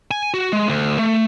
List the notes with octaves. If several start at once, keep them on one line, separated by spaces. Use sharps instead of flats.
G#5
F#4
G#3
D2
A3